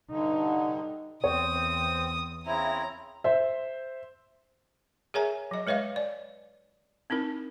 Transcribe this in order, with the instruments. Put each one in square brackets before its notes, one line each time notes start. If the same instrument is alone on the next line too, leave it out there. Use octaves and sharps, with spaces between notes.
[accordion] G2 D3 [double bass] D#4
[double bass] E2 [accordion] C4 [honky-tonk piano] C#5 [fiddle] D#6
[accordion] C#3 C4 E4 [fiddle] A#5
[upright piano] C5 E5
[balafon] G#4 A#4 C#5 E5 G#5 A#5
F#3 D#5
G#3 B4 C#5 D#5 F5
D5
C4 D#4 E4 A#4